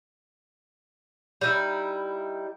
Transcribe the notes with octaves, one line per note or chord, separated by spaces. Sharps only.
G3 D#4 E4